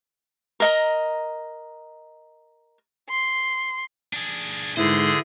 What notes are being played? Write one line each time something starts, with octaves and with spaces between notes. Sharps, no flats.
A#4 D#5 A#5
C6
D4 G#4
G#2 D3 E4 G#4 B4 C5